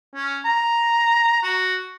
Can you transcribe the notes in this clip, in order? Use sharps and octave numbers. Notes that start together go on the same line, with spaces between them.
C#4
A#5
F#4